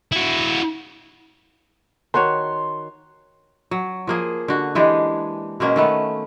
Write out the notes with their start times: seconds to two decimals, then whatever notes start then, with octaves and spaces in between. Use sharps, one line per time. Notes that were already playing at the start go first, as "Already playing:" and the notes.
0.12 E4 F#4
2.14 D#3 F#4 C#5 C6
3.71 F#3
4.07 F3 A#3 G#4
4.48 D3 F#4
4.75 E3 G#3 D4 G4
5.60 B2 G#3 A#3 C#4
5.76 D#3 A3 B3